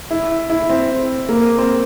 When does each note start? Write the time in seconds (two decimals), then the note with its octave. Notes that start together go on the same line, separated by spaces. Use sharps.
0.11 E4
0.50 E4
0.70 C4
1.29 A#3
1.58 C4